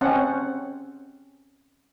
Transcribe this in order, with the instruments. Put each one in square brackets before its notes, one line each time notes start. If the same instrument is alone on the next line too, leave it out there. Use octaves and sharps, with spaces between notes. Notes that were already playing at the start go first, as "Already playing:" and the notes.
[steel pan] C4 C#4 F#5